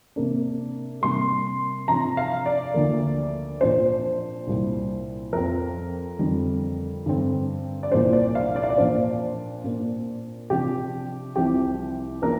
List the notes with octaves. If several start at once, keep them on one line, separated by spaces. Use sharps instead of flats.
C3 A#3 D4
C3 G3 A#3 C6
C3 F3 D4 A#5
F5
D5
D2 D3 F3 A#3
A#2 F3 D4 C5
C2 A#2 G3
F2 F3 C4 A#4
F2 D3 G3 C4
G2 D3 G3 C4
D5
C2 A#2 F3 A#3 D4 C5
D5
F5
D5
F5
D5
A#2 F3 A#3 D4 C5
A#2 A#3 D4
C3 F3 D4 G4
C2 C3 F3 C4 G4
F3 A#3 D4 A#4